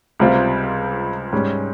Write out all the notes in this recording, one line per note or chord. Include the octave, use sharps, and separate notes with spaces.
C#2 C3 G3 C4 F4
G#2 G3 C#4